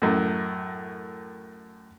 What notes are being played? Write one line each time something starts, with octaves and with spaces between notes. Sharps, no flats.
F#2 A2